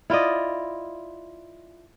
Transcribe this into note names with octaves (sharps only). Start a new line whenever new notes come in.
E4 F4 D5 D#5